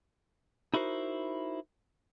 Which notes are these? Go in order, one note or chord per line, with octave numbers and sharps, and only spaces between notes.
D#4 E4 F#4 A#4 C5